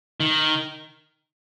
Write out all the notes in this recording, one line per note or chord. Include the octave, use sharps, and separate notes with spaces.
D#3